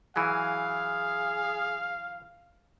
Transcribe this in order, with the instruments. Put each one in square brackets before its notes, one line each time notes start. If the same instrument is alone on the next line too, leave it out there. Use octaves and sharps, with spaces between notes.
[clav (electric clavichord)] E3 F#3 [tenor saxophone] G#4 [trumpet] F5